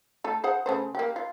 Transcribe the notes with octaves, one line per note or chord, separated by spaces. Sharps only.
A3 A4
G#4 C5 F#5
C#3 A3 C5
A#3 G4
F4